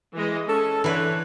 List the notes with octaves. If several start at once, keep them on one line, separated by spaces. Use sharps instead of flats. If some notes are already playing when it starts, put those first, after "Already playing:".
E3 G#3 D#5
C#4 A4
D3 E3 B4 C#5